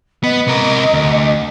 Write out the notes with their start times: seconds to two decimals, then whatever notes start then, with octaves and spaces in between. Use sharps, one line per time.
0.24 B3 D#5
0.47 C3 A#4
0.93 D2